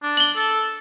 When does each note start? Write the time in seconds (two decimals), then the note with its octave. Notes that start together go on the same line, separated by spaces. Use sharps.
0.02 D4
0.17 F#7 G7
0.36 A4